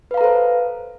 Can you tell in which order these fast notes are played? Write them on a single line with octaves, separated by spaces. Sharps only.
B4 F5 A#5 A4 C5